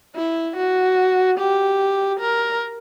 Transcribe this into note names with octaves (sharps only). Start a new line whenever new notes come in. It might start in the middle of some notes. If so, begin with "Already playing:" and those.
E4
F#4
G4
A#4